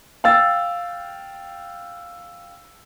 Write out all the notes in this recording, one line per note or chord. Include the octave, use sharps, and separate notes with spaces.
F5 G5 E6 A6